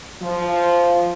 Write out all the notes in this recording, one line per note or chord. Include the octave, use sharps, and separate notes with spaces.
F3